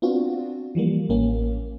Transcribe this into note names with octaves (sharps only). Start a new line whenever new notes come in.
B3 C4 D4 F4 F#4
E3 F3 G3 A#3
A1 A#3 C#4